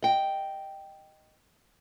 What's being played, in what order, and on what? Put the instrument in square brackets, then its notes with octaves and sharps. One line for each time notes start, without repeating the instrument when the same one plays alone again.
[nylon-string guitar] D#5 G5